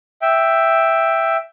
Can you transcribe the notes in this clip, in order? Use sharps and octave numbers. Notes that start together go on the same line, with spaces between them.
E5 G5